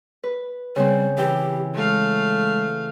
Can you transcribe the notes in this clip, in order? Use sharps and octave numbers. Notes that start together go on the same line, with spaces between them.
B4
C#3 G3 C4
E3 G4 G5 B5
G#3 A3 F5